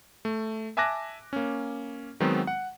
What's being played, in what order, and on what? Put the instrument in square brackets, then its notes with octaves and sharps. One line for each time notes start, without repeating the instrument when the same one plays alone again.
[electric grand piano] A3
E5 G#5 A5 D6 F#6 A#6
A#3 C#4
D#3 F#3 G#3 B3 C4
F#5